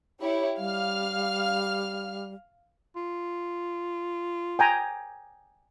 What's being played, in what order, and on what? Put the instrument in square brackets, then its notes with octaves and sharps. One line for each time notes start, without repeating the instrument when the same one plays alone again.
[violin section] E4 G4 C#5
[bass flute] G3 [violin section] F5 F6
[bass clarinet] F4
[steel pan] G5 G#5 A#5